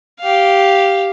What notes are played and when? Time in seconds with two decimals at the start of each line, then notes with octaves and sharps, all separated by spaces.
0.20 G4 F5